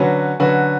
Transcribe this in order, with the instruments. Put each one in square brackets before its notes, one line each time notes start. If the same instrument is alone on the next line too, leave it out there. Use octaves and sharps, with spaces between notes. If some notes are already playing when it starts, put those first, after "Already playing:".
Already playing: [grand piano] D3 F#3 C#4 F#4 B4
D3 F#3 C#4 F#4 B4